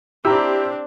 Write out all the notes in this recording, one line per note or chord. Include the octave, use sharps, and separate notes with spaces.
C4 D4 E4 G4 A#5 E6